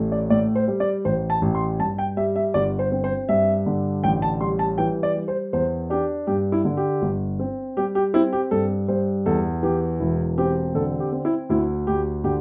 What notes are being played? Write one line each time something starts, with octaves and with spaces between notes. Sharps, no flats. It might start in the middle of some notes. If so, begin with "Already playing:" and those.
Already playing: A1 A3
D5
A2 D5
C5
G3
D5
A1 C5
A5
A1
C6
G2 A5
G5
G3 E5
E5
G1 D5
C5
C4
C5
G2 E5
D3
A1 G5
A5
G3 C6
A5
E3 G5
D5
G3
C5
E2 C5
D4 G4
G2 G4
E4
D3
G4
G1
C4
G3 G4
G4
C4 E4
G4
G2 A4
G2 C5
E2 A4
E3 G4
E1 E4
C4 G4
D3 A4
G4
C4
E4
D2 E4
D2 G4
D3 G4